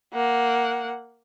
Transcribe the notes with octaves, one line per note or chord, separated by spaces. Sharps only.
A#3 F#5